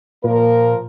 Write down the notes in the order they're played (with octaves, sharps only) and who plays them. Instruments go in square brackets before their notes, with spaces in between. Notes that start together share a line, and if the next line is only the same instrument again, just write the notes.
[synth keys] A#2 [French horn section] F3 A#3 A#4